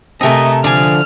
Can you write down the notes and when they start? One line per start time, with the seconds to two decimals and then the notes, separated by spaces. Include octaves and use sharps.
0.21 C3 A3 C4 A4 A#4 D#5 G#5
0.64 D3 F3 G#4 D5 F6